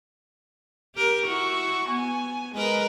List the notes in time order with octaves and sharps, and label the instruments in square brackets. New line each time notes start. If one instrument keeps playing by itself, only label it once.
[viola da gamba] G4 A#4
[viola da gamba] E4 F#4 [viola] C#6
[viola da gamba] B3 [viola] G#5
[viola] G#3 [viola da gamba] A#4 B4 D#5